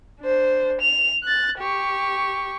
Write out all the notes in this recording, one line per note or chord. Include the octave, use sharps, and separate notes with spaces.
D4 C5
F7
F#6 A6
G4 C#6